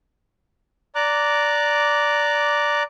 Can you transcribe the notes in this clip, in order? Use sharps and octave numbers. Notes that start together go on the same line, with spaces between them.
D5 A#5 D6 F#6